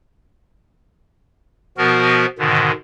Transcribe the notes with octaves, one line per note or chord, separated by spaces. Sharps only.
B2 F3 B3 F#4 A#4
G#2 B2 D3 D#3